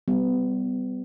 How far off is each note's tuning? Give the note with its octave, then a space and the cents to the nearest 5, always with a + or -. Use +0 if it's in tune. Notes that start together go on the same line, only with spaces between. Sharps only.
G3 -15 B3 +35